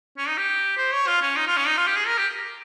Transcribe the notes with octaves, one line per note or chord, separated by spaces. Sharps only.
C#4
D#4
G4
C5
C#5
F4
C#4
D#4
F4
C#4
D#4
F4
G4
G#4
A#4
G4